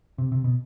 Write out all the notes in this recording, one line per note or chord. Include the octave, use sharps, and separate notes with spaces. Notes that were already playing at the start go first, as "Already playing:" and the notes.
C3
C3
B2